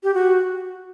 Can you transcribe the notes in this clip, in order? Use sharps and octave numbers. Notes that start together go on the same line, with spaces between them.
G4
F#4